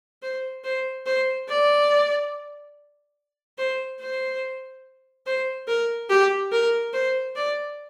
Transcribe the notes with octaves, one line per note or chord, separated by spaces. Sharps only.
C5
C5
C5
D5
C5
C5
C5
A#4
G4
A#4
C5
D5